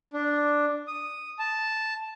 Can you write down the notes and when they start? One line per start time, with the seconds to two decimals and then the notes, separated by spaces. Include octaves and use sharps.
0.13 D4
0.87 D#6
1.39 A5